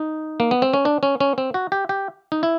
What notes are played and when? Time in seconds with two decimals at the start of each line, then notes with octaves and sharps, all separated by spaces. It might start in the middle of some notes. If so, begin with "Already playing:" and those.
Already playing: D#4
0.40 A#3
0.51 B3
0.62 C4
0.73 C#4
0.85 D4
1.03 C#4
1.20 C#4
1.38 C4
1.54 F#4
1.72 G4
1.89 G4
2.32 D#4
2.43 E4